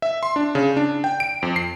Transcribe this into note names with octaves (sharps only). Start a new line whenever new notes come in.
E5
C6
D4
C#3
D4
G5
D7
F2
C7